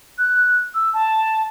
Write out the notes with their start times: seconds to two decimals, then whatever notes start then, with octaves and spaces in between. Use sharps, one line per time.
0.18 F#6
0.74 E6
0.93 A5